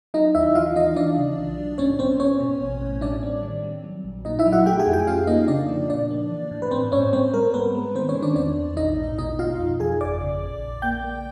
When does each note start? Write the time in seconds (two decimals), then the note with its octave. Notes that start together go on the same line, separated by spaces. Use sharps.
0.14 F#3 D#4 D#5
0.35 D#2 E4 E5
0.55 E3 F4 F5
0.76 E3 D#4 D#5
0.96 E3 D4 D5
1.17 C#3
1.38 B1
1.58 F#3
1.78 G#2 C#4 C#5
1.99 G#2 C4 C5
2.20 B3 C#4 C#5
2.40 B2
2.61 A1
2.82 A2
3.01 G3 D4 D5
3.23 C4
3.43 D#3
3.64 G3
3.84 F#3
4.04 A#1
4.25 A#2 D#4 D#5
4.39 E4 E5
4.46 F#3
4.52 F#4 F#5
4.66 A3 G4 G5
4.80 G#4 G#5
4.86 F2
4.93 G4 G5
5.07 C#4 F4 F5
5.27 A#3 D#4 D#5
5.48 C#3 D4 D5
5.69 F3
5.90 A#2 D4 D5
6.11 A#3
6.31 E3
6.51 A2
6.62 B4
6.71 G#2 C4 C5
6.92 G#2 C#4 C#5
7.13 G3 C4 C5
7.33 G3 A#4
7.54 G#2 B3 B4
7.74 G#3
7.95 D#3 C4 C5
8.09 C#4 C#5
8.15 D#3
8.22 D4 D5
8.36 E2 D4 D5
8.57 E2
8.77 A#1 D#4 D#5
8.98 G#2
9.18 B2 D#4 D#5
9.39 B2 F4 F5
9.59 F2
9.80 F2 G#4 G#5
10.00 G1 D5 D6
10.21 C#3
10.42 A#1
10.62 A#1
10.82 A#3 G5 G6
11.04 A#3